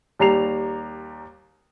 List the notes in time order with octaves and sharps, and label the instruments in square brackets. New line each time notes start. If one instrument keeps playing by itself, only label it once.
[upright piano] D#2 G3 A#5 C7 F7